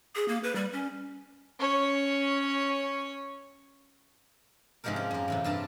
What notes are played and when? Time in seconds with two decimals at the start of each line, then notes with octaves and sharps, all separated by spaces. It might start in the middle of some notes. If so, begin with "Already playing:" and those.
0.15 G#4
0.28 A#3
0.43 B4
0.56 G3
0.73 C#4
1.59 C#4 C#5
4.84 G#2 C3 F3 G#3 G4 A#4
4.96 C#4
5.11 F#2 A#3
5.28 E2 A2 C3
5.44 G2 F4 G4 A5